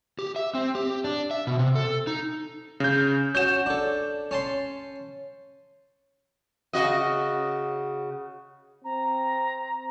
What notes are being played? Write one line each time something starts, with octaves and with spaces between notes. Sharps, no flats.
G4
E5
C4
G4
D4
E5
B2
C3
A4
D#4
C#3 G6
C#4 F#4 G6 E7
D4 A4
C#4 A5 C6
C#3 F#4 D#5
C4 A#5